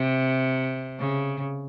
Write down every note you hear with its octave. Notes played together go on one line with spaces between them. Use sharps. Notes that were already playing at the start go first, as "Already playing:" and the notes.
Already playing: C3
C#3